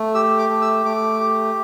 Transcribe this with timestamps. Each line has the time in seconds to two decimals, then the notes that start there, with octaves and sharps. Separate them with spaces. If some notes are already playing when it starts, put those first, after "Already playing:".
Already playing: A3
0.14 G4 E6
0.38 D6
0.50 A3
0.62 E6
0.85 A3 D6
1.20 G4